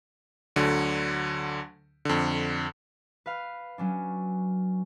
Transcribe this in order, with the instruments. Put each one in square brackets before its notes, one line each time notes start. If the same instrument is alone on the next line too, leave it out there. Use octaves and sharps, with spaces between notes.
[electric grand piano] D2 D3 F#3
F2 D3
[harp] B4 F5
F#3 C#4 D4